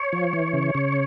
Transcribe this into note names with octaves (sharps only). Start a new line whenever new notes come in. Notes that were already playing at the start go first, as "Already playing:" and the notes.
Already playing: C#5
F3
E3
C#3
C#3